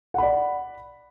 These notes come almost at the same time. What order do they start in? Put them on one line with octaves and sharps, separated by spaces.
F#5 B5 D5